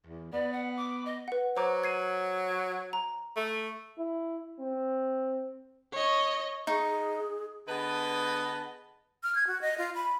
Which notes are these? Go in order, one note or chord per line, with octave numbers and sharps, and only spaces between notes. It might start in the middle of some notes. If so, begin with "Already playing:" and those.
E2
B3 D5
F#5
D6
D#5
B4 F#5
F#3 C5 A#5 D6
G#6 C7 D#7
A#5
A3
E4
C4
C#5 D#5
D#4 G#4 C#6
D3 B3 G#4 B4 D#5 A5
F6
G#6
F#4
D#5
F4
B5